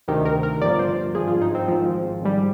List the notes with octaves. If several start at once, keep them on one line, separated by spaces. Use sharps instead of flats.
D2 C3 D#3 G4
A#4
A#4
G1 G2 F3 D5
C5
G#1 G2 F3 G#4
F4
D#4
C4
G#1 G#2 F3
G#1 G#2 G3